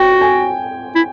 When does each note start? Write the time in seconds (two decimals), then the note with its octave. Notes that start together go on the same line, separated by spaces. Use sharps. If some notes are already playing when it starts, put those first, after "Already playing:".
Already playing: F#4 G5
0.21 G#5
0.95 E4